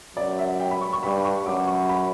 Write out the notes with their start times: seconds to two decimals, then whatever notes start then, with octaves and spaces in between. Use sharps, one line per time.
0.16 F#2 D5
0.39 E5
0.60 G5
0.71 B5
0.81 C#6
0.93 C#6
1.03 G2 B5
1.25 C#6
1.46 F#2 D6
1.67 C#6
1.89 B5